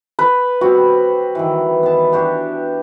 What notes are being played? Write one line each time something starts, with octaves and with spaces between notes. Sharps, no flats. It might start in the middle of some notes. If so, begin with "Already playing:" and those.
B4
G3 C4 F#4
D#3 E3
B3 A5
D4 F#4 G4